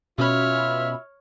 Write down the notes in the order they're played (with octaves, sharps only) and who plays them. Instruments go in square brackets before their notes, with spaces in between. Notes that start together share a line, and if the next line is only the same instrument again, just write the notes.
[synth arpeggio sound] B2 C#4 B5 [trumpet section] F4 E5 [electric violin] C#5 F6